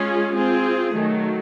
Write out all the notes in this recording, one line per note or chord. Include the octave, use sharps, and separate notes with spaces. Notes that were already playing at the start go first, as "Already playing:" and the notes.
Already playing: G#3 C#4 F4 G#4
C4 F4 G#4
D#3 F#3 A3